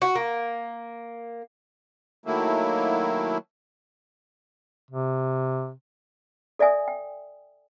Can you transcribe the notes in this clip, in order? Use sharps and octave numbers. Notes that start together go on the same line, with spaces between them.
F#4
A#3
D#3 F#3 A3 A#3 E4
C3
A4 D5 E5 G#5 D#6
G5